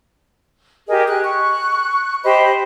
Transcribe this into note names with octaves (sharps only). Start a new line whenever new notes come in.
G4 G#4 A#4 D#5
G#4 F#6
C#6 F#6
G4 C5 D#5 B5